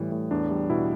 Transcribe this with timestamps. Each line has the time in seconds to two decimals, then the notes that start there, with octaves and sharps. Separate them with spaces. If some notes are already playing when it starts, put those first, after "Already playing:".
Already playing: A2 E3 G3
0.12 A2
0.31 E2 D4
0.51 G3
0.70 B2 E4